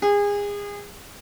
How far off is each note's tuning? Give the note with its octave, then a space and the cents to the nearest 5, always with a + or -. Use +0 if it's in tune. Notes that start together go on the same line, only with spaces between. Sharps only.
G#4 -30